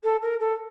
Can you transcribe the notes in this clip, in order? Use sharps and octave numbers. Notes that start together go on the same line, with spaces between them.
A4
A#4
A4